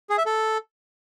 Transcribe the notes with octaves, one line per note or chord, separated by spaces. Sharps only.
G#4
E5
A4